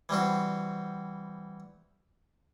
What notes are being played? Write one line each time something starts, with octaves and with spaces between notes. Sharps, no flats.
E3 G3 C4 F#4